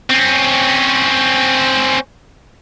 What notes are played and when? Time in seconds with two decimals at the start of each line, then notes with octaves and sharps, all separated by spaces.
0.10 C4 C#4